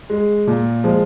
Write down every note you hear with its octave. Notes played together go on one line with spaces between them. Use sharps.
G#3
A#2
F3 G#3